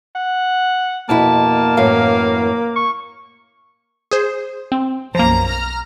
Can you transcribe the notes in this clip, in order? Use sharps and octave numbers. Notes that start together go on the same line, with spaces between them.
F#5
F2 B2 A#3 E4 A5
F#2 A2 E3 F5
C#6
G#4 C5
C4
B1 F#2 F3 A#3 A#5
A#5 F6